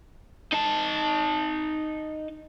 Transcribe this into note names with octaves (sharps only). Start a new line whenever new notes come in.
D#4 A5